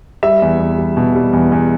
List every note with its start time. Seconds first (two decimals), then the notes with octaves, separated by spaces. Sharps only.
0.23 G3 E5
0.42 E2
0.60 E2
0.78 G3
0.97 B2
1.15 G3
1.33 E2
1.52 E2